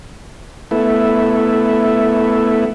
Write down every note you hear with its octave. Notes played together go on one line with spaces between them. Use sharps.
A3 B3 E4